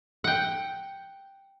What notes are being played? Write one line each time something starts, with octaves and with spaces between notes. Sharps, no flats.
F#5 G5